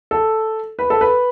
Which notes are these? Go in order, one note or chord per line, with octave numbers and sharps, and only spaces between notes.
A4
B4
A4
B4